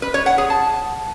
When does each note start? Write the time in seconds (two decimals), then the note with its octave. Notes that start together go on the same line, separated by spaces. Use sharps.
0.02 B4
0.14 C#5
0.26 F#5
0.38 G#4
0.50 A5